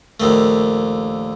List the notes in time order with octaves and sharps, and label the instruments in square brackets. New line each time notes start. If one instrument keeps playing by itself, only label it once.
[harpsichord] A#1 D#2 A3